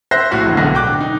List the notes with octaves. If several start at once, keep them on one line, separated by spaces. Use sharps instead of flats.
C5 E5 F#6 A#6 C7
A#1 A2 F#4 F5
E1 D3
E1 B1 B2 D3 A#6
G5 D6 F#6
D#4